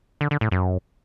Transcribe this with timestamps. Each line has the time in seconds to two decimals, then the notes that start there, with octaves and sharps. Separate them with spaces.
0.21 D3
0.31 D3
0.41 A2
0.52 F#2